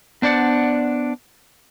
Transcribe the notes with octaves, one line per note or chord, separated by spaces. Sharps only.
B3 D4 C5 D5 F#5